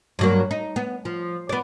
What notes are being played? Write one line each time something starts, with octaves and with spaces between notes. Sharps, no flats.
G2 F#3 A#3
D#4
B3
F3
B3 D5